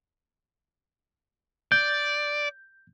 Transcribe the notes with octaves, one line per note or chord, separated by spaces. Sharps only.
D5 G6